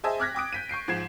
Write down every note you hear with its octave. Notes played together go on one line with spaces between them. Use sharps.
G#4 C5 D#5 E5 G#5 A5
D6 F6 F#6 G#6 A#6 B6
G5 D6 D#6 D7
G6 B6 D#7
C#6 G6 C7 D7
G#2 F3 G#6 C7 E7